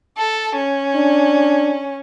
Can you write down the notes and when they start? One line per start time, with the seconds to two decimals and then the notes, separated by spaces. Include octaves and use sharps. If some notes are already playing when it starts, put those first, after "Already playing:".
0.18 A4
0.57 C#4
0.96 D4